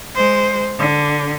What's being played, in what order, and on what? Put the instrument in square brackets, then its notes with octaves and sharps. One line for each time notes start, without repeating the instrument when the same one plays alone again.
[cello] G#3 C5
D3